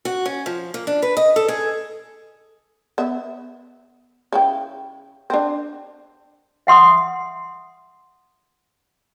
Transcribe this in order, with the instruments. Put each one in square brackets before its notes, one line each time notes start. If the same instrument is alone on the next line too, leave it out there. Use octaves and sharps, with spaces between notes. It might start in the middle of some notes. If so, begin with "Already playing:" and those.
[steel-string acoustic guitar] F#4
C#4
F3
A#3
D4
B4
D#5
A4
G#4
[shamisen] B3 E5
C#3 E4 G5
C4 D4
[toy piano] E5 F#5 C6 D#6